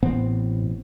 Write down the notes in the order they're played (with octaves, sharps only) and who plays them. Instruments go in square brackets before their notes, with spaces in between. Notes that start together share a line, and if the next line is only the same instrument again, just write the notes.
[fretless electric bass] A1 B3 C4 [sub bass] A2